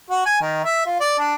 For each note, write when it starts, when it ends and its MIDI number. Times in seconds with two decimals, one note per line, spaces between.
0.10 0.21 66
0.26 0.40 80
0.41 0.62 51
0.65 0.83 76
0.86 0.97 65
1.00 1.14 74
1.19 1.35 62